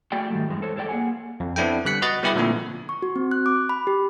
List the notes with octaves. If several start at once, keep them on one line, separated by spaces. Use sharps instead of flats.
A3 F#4 G#4 D5 G5
G#2 D#3 F3 G3 A3
E2 G2 G#3
A4 C5 C#5
G#4 A4 C#5 D5 G5
A#3 G#4 A#4 F#5 G#5
F2
B3 C4 D4 E4 A4 G5
D3 G3 F#6 B6 C#7
F#4 B4 D#5 F#6 A6
G3 B3 E4 G4 G#4 B4
A#2 D3 F3 A3 C4 E4
C#6
F#4
C4
F#6
D6
B5
G4